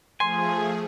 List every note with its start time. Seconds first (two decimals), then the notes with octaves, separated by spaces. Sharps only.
0.20 F3 A3 G#4 G#5 C6